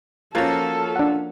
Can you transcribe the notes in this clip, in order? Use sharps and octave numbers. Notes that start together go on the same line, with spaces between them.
F3 A#3 C#4 F4 F#4 A4 G#6 A6
D4 F#5